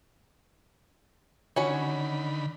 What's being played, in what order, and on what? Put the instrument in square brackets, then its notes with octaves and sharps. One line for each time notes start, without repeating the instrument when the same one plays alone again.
[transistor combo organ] D3 D#3 B5 [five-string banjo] C#4 F#4 C#5